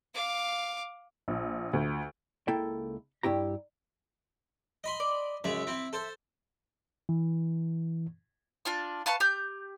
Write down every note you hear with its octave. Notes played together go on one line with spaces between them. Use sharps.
F5 D6
A#1
D2
C#2 A#3 E4 A4 G5
G2 E4 G4 A#5
D#5 B5 C6
D5
F#2 C#3 G#3 E5
C4 E4
A4 C5
E3
D4 F4 F6
B4 F5 A5 C#6
G4 G6